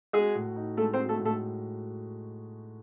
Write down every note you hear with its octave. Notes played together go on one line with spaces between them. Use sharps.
G#3 F#4 G#4
A2
D#4
G#3 A3 A4
C4 C5
F#4
A3 A4
A2
A3 A4